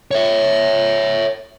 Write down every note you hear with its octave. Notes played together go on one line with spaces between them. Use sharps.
C#5 E5